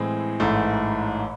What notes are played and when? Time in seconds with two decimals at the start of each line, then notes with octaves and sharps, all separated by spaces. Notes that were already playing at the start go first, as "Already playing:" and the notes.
Already playing: A2 E3 G#3 C4
0.40 A1 G#2 E3 A3